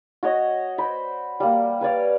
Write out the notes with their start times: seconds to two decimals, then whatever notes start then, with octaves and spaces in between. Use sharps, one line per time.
0.23 F#4 C#5 D#5
0.78 C5 D5 B5
1.40 G3 A#3
1.81 B4 C#5 D5 F5